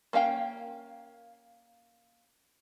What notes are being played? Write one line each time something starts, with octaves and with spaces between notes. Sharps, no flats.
A#3 C#4 F5 G5